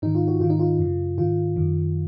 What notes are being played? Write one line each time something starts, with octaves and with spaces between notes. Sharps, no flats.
G#2 D#3 D#4
F4
F#4
G#2 D#3 F4
D#4
F4
F#2 C#3
G#2 D#3 F4
F#2 D#3